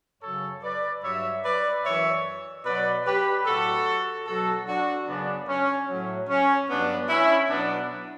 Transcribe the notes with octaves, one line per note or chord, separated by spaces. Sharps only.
F#2 C#3 F#3 A4 C#5
B4 D5
G2 F#3 C#5 E5
B4 D5
F#2 E3 C#5 E5
B2 F#3 B4 D5
G4 B4
A2 F#3 F#4 A4
B2 F#3 F#4 A4
D4 F#4
F#2 C#3 F#3 B3 D4
C#4
A2 F#3
C#4
G2 F#3 B3 D4
C#4 E4
B2 F#3 B3 D4